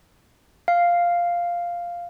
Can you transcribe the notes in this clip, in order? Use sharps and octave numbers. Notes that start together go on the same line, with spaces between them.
F5